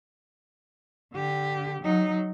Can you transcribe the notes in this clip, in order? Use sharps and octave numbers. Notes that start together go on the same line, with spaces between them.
D3 G4
F#3 D#4